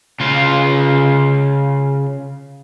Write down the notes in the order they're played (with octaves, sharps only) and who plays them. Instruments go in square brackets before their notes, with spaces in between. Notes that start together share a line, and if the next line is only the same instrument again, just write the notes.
[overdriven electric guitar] C#3 F4